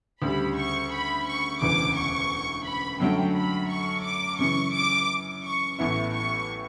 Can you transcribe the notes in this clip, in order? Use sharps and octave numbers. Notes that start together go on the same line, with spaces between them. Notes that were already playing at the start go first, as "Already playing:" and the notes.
D2 C#3 G3 B5
C#6
B5
C#6
E1 D2 C#3 E3 D6
C#6
B5
F#2 D3 F#3 A3 G5
B5
C#6
D6
F#2 C#3 E3 C#6
D6
C#6
A1 A2 E3 B3 E4 C#6
C#6